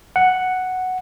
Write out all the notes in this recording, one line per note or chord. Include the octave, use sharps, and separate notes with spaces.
F#5